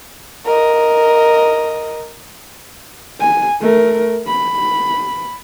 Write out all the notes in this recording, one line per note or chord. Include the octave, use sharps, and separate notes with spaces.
A#4 D#5
G#5
A3 A#4
B5